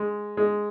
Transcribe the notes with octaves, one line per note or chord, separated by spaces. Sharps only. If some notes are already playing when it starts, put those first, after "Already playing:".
Already playing: G#3
G#3